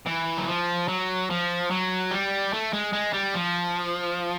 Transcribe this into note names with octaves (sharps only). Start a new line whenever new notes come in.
E3
F#3
F3
F#3
F3
F#3
G3
A3
G#3
G#3
G3
F3